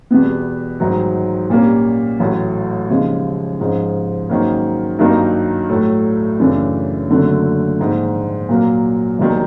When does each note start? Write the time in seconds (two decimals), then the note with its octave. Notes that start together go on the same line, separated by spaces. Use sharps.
0.11 E2 B2 G3 B3
0.80 A1 G#2 D#3 F#3
1.50 A#2 G3 A#3 C#4
2.20 A1 A2 F#3
2.90 D#2 C#3 F3 G#3
3.60 G#2 F3 G#3 C#4
4.29 G#2 D#3 F#3 A#3 C#4
4.99 G2 D#3 F#3 A#3 D#4
5.69 A2 F#3 A3
6.39 F#2 C#3 E3 A3 D4
7.10 F#1 F#2 D3 F#3 A3
7.79 A#1 G#2 D#3
8.49 A#2 F#3 A#3
9.19 E1 D#2 D#3 F#3